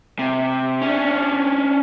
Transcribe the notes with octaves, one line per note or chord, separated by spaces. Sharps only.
C3
C#4 D4